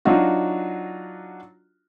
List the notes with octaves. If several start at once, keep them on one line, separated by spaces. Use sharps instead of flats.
F#3 D4 D#4 F4 F#4